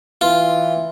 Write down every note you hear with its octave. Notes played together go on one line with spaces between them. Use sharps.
E3 F4